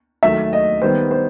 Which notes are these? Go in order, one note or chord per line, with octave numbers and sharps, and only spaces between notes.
D#3 F#3 A3 E5
D#5
D#3 G3 B3 C5
C5